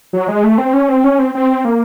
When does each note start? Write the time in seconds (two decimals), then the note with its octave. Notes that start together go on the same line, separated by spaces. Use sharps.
0.13 F#3
0.28 G#3
0.44 A3
0.58 C4
0.73 C#4
0.89 C4
1.04 C#4
1.19 C4
1.35 C4
1.65 A#3